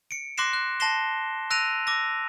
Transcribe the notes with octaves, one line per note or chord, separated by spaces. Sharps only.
C#7 D7
C6 D6 F#6 A#6 C7 E7
F#6
A5 C6 A#6 C7 E7 G7
E6 F#6 A#6 D7 D#7 F7
D6 E6 A#6